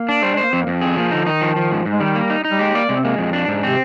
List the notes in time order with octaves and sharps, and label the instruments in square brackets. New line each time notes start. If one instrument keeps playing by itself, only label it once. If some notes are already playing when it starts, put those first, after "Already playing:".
Already playing: [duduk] A#3
[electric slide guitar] D4
[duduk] G3 [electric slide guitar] C5
[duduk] G#3 [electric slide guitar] C5
[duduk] A#3
[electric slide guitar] F2 [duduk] C4
[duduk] A#3
[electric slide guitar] F2
[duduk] C4 [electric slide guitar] G#4
[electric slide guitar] F3 [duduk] A#3
[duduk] D3 [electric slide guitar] D#4
[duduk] D#3 [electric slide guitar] D#4
[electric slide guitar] F3
F3
G#2
G#2
[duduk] G#3
[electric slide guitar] D#3 [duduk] G3
[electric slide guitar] A#3
D#4
D#4
[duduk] G3
[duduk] G#3 [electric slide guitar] G4
[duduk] A#3 [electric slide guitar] D5
[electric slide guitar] C3 [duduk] G#3
[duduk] C4
[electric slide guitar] G#3 [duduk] A#3
[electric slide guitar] F2
D4
G#2
[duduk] C3 [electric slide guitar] C4